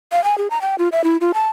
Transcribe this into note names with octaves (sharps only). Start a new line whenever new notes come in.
F5
G#5
G#4
A#5
G5
F4
E5
E4
F4
A5